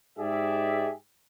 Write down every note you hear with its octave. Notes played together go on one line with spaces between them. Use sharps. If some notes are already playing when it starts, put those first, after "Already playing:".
G#2 G#3 G4 G#4 D5 E5